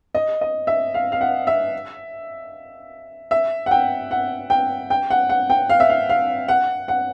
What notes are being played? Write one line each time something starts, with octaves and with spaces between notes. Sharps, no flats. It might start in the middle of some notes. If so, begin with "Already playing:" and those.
D#5
D#5
E5
F5
F5
F#5
E5
E5
F#5
G5
F#5
G5
G5
F#5
F#5
G5
F5
E5
F5
F5
F#5
F#5